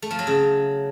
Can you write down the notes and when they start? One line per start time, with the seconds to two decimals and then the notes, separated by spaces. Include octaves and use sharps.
0.02 A3
0.11 F3
0.19 F#3
0.27 C#3